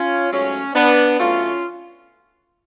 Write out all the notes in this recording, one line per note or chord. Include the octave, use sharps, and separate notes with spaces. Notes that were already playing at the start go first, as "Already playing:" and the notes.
Already playing: C#4 F4
G#2 F#3 A3 C#4
B3 D4
A2 F#3 A3 C#4 F4